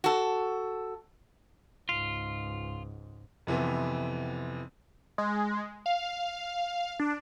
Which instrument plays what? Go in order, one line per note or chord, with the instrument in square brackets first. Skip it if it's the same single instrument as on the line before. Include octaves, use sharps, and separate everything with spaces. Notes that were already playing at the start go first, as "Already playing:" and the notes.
[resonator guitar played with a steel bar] F#4 A4
[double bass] C#2 G#2 [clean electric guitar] F4
[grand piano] F2 C3 E3 B3
[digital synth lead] G#3
F5
D4